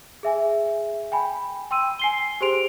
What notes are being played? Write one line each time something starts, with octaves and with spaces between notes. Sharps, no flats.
G#4 E5 G#5
G5 G#5 B5
G5 C6 E6 D#7
G#5 C7 G7
G4 G#4 C5 C6 D7 F7